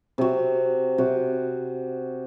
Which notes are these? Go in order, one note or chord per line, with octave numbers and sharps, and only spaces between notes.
C3 F#4
C3 F#4